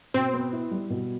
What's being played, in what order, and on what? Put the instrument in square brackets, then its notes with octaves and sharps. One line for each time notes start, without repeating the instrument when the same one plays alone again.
[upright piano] B2 [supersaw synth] C4
[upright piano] B3
E4
G3
B2